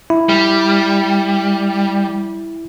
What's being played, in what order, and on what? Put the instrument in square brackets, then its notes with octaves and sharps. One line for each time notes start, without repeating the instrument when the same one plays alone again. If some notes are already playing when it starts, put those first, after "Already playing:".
[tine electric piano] E4
[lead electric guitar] G3